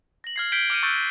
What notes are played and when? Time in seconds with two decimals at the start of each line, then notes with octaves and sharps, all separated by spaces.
0.24 A#6 F#7
0.36 F6 G#6 C7
0.52 G6 G#6 B6 C7 D7 G7
0.70 D6 F6 C#7 D#7
0.83 C#6 E6 F#6 G6 A6 G7
0.97 G6